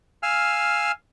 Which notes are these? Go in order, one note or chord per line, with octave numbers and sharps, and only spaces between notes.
F5 G#5 E6 F6